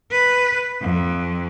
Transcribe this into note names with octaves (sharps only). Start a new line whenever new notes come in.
B4
F2